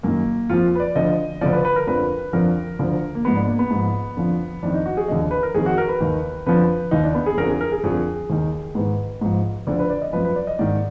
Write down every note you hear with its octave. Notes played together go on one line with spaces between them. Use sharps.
F#2 D#3 A#3
F2 F3 F4
B4
D5
D2 D3 F3 D#5
D2 D3 F3 D5
B4
B4
A#4
F2 D3 F3 B4
F2 D3 F3 A#4
D2 D3 F3
A#3
G#2 F3 B3
D4
A#3
B3
G#2 F3
F2 D3 F3
F2 D#3 D4
D#4
F#4
G#4
D#2 D3 F3 D#5
B4
A#4
F2 D#3 G#4
F#4
A#4
B4
D#2 D#3
F2 D3 F3 B4
D#2 D#3 D#4
D4
B3
G#4
F2 D3 F3 A#4
G#4
A#4
G#4
F2 D3 F3 G#4
D#2 D#3
G#2 D#3 B4
G#2 F3
D2 D3 F3 D5
B4
D5
D#5
F#2 F3 B4
B4
D5
D#5
G#2 D#3 D5